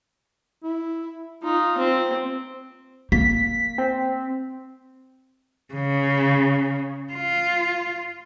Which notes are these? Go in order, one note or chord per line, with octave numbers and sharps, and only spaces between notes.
E4
D#4 F4
C4
A#3 B6
C4
C#3
F4